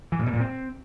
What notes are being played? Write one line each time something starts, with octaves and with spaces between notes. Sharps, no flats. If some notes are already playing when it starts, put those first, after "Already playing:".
E3
A2
B2
A#2
C4